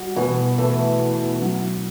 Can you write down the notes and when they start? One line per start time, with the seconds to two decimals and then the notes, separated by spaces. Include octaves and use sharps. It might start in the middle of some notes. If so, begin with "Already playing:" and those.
Already playing: G3 F#4
0.16 B2 E3
0.58 E3 A3
1.00 B2
1.42 F#3